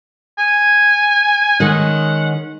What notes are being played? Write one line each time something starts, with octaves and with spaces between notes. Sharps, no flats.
G#5
D#3 G#3 C#4 F#5